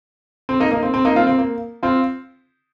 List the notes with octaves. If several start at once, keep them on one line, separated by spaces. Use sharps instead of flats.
C4
A#3 D#4
A#3 D#4
C4
C4
A#3 D#4
C4 F4
C4
A#3
C4 F4